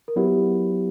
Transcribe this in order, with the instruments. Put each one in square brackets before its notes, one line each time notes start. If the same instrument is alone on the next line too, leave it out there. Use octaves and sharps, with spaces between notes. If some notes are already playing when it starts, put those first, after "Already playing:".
[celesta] A#4
[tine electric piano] F#3 B3 E4 [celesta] G4